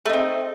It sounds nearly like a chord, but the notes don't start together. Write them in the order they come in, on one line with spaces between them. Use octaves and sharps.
A3 D#4 C4